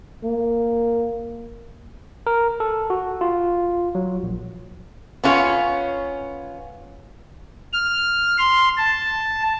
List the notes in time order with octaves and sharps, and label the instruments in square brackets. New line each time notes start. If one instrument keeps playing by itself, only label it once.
[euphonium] A#3
[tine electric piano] A#4
A4
F#4
F4
F#3
A#1
[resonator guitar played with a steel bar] B3 C#4 F4 G4 C#5
[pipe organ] F6
C6
A5